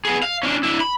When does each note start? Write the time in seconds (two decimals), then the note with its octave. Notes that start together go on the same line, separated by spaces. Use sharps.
0.05 B3 G#4
0.23 F5
0.43 C#4 D4
0.63 D4 E4
0.80 B5